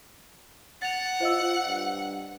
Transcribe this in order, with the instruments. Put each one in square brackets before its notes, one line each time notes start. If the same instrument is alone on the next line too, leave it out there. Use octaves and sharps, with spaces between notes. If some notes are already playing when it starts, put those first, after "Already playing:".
[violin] F#5 [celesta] A6 F7
[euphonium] F4 [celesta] C5 D#5 E6
[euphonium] G2